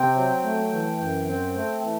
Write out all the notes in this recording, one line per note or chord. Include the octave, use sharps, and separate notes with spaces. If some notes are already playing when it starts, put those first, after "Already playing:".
Already playing: C3 C4 G5
F#3
A3
E3
F#2
C4
A3
E3